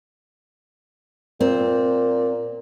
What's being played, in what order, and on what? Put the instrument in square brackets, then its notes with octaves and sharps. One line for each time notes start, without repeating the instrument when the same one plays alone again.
[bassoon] A#2 [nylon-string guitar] C4